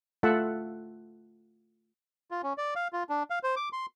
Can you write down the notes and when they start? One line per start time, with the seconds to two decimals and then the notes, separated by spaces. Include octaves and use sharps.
0.23 A3 F4 A4 E5 F#5 A5
2.31 F4
2.43 C#4
2.58 D5
2.75 F5
2.93 F4
3.09 D4
3.30 F5
3.43 C5
3.56 D6
3.73 C6